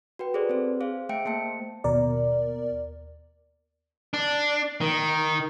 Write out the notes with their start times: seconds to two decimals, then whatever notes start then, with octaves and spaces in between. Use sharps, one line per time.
0.19 F#4 B4 G5
0.34 G#4 A4 B4 C5 D5
0.49 C4 C5
0.81 G#4 C5 F5
1.09 A3 E5 G5 C#7 D7
1.25 A3 A#3 C5 A5 C#7
1.84 D#2 B2 A#4 D5
4.14 D4
4.81 D#3